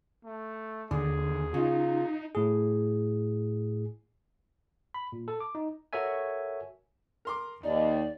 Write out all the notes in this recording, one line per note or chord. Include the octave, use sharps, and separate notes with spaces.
A3
D#2 D3 G#4
C#3 D#4 F4
A2 G#4
B5
A#2
A4
D6
D#4
F#4 A4 A#4 C#5 E5 G#5
A#4 C6 D6
D#2 D#4 D5